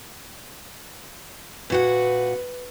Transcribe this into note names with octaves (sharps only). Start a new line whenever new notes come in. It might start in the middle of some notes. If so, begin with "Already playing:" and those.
A#2 F#4 B4 F#5